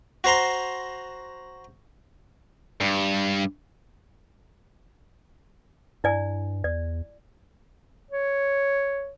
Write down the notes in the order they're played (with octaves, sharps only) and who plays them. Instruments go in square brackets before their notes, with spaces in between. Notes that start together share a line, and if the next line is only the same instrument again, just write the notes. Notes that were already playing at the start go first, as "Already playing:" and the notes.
[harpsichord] F#4 C5 A#5 C6
[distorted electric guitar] G2
[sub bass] G2 [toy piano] E4 D5 G#5
[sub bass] E2 [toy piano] D5
[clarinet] C#5